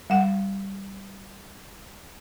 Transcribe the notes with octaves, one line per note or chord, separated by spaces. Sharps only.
G3 F#5